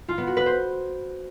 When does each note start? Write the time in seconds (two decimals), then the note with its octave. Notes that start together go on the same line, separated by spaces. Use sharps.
0.08 F4
0.18 B3
0.27 F#4
0.37 B4
0.46 C5